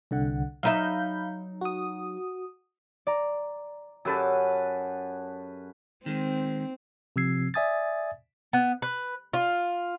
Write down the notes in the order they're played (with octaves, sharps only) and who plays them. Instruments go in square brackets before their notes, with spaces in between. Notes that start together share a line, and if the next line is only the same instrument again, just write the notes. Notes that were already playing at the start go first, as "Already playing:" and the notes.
[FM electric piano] C2 D3 F#5
[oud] F#3 D#4 E5 [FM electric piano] F5 B5 G6
[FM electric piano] F#4 D#6
[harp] D5 A#5
[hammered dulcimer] F#2 B4 A5 [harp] G4 A4 E6
[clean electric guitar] D#3 G#3 [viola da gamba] C4
[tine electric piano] C3 F3 C4 E6 G#6 C7
D5 E5 G#5 D#6 G#6 A6
[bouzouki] B3
B4
F4